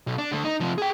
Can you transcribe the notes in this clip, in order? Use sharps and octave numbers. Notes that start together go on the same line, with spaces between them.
B1
D4
D3 A3
D#4
C3 F3
G#4 G5